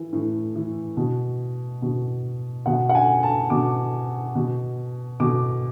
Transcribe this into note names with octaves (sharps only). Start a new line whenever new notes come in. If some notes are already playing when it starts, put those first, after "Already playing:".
Already playing: E3
A2
E3
B2
B2
B2 F#5
F#5
G#5
A5
B2 D6
B2
B2 D6